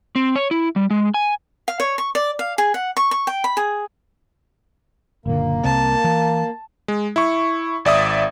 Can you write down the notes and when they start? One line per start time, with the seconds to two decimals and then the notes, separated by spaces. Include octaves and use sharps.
0.16 C4
0.36 C#5
0.51 E4
0.76 G3
0.90 G#3
1.14 G#5
1.68 F5
1.80 C#5
1.98 C#6
2.15 D5
2.39 F5
2.58 G#4
2.74 F#5
2.97 C#6
3.11 C#6
3.27 G5
3.44 B5
3.57 G#4
5.26 F#1 A#2 D3 A#3
5.64 C2 C3 C4 A5
6.04 E3
6.88 G#3
7.16 E4 C#6
7.85 G#1 D5 E5 D#6